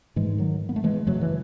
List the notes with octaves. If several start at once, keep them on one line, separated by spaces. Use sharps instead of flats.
G#2 E3 G#3
D#3 F#3
B3
A3
E3 G#3
F#2 C#3 F#3 A3
E3